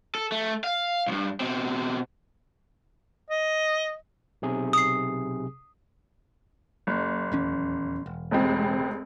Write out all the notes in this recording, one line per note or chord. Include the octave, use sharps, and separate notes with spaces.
A4
A3
F5
C2 G2
B2 C4
D#5
B1 C3 G#4
D#6 C7
F#1
D#1 E2 C#4
E1
F1 C#2 C4